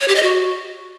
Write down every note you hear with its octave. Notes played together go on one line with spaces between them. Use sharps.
C#5
G4
D#5
F#4